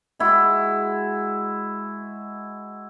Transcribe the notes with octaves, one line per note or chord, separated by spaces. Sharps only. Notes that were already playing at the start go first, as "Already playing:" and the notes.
G#3 E4 F#4